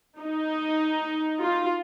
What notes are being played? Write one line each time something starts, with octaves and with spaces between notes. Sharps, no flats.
D#4
F4